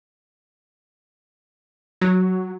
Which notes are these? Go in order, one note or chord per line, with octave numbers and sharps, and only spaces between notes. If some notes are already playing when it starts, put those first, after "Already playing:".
F#3